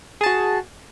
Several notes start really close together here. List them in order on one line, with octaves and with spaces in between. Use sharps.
G#4 A5 F#4